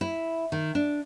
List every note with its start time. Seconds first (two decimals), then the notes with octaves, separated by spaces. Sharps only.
0.01 E4
0.52 D#3
0.75 D4